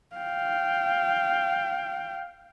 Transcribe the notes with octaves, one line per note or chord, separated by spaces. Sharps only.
F5 G5